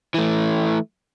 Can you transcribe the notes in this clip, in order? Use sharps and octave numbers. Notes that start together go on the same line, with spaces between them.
E3 A3